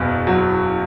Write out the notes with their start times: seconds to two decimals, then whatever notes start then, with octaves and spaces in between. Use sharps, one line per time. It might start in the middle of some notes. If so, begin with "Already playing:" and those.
Already playing: F#1 E2 B2
0.27 F#3